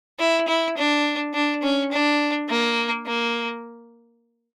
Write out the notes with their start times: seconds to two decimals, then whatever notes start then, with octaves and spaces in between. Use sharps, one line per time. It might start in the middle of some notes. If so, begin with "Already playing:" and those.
0.19 E4
0.48 E4
0.77 D4
1.34 D4
1.63 C#4
1.92 D4
2.49 A#3
3.06 A#3